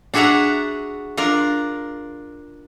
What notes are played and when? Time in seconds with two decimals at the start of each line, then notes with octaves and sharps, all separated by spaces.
0.14 D4 F#4 G#4 E5 F#5 A#5
1.17 D4 F4 A#4